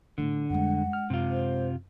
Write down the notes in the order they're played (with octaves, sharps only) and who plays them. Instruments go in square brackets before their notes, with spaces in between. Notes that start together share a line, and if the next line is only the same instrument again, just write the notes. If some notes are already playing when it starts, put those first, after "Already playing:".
[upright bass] A2 G3 [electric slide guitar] D3
[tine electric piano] F2 G3 [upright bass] G#3 D4 [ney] F#5
[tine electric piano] F6
[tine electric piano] F#2 [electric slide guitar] C3 F4
[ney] C5